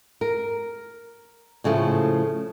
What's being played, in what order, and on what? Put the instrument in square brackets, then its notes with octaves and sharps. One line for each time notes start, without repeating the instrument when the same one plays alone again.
[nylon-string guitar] A#4
A2 C#3 F3 A3